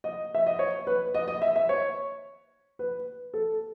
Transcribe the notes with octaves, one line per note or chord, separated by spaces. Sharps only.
D#5
E5
D#5
C#5
B4
D#5
D#5
E5
E5
C#5
B4
A4